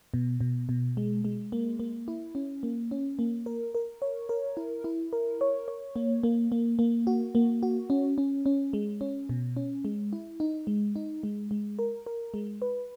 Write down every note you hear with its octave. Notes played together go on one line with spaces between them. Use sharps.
B2
B2
B2
G#3
G#3
A#3
A#3
E4
C#4
A#3
C#4
A#3
A#4
A#4
C#5
A#4
E4
E4
A#4
C#5
C#5
A#3
A#3
A#3
A#3
F#4
A#3
F#4
C#4
C#4
C#4
G#3
C#4
B2
C#4
G#3
E4
D#4
G#3
D#4
G#3
G#3
A#4
A#4
G#3
B4